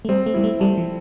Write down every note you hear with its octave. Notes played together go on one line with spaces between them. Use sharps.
A3
G3 C4
A3
G3 E4
A3
G3 A4
F3